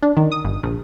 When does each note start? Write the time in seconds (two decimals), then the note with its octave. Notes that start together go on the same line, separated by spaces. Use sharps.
0.02 D4
0.17 D#3
0.32 D#6
0.44 G1
0.63 A#1